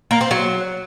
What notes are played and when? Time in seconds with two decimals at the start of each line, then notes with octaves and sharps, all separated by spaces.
0.11 A#3
0.21 C4
0.31 F#3